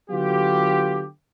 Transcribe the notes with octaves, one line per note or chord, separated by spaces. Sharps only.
D3 F#3 B3 F4 G4